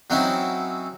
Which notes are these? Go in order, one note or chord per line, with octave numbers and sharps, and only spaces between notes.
F#3 C4 C#4 D#4 E4